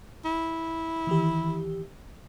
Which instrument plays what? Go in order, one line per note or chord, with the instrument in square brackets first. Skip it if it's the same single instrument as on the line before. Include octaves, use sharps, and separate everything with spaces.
[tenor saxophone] E4
[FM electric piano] D#3 E3 G4